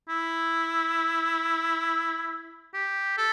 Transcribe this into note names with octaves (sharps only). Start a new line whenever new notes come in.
E4
G4
A4